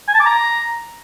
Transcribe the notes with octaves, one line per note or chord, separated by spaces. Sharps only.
G#5
A5
D6
A#5